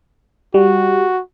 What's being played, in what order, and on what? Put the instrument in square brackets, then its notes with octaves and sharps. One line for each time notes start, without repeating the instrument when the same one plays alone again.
[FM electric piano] G3 [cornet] F#4